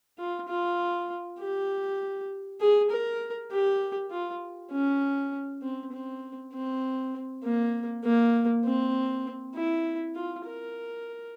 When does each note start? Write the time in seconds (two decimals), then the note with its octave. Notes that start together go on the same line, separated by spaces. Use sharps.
0.18 F4
0.48 F4
1.39 G4
2.61 G#4
2.90 A#4
3.51 G4
4.11 F4
4.71 C#4
5.62 C4
5.92 C4
6.53 C4
7.44 A#3
8.04 A#3
8.65 C4
9.55 E4
10.15 F4
10.46 A#4